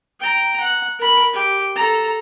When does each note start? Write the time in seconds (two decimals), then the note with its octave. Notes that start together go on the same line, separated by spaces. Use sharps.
0.20 G5 A#5
0.60 F#5
0.99 A#4 B5
1.34 G4
1.76 A4 A#5